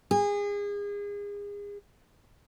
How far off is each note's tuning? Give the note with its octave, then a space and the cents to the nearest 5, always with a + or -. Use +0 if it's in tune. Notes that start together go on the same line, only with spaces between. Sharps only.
G#4 -30